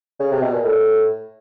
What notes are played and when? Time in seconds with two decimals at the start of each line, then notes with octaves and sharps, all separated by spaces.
0.20 C#3
0.32 C3
0.42 B2
0.53 A#2
0.65 A2